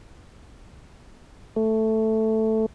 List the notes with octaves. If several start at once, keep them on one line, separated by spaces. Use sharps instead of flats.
A3